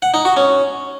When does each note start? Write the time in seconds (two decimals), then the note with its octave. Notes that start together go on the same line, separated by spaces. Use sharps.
0.02 F#5
0.14 D#4
0.25 F#4
0.37 C#4